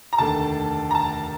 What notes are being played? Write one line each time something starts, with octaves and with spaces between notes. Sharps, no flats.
A#5
F1 D#2 D3 A3 A5
A#5
A5